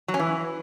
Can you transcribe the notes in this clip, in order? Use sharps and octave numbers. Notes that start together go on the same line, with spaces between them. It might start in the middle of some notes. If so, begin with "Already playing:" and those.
F#3
C#4
E3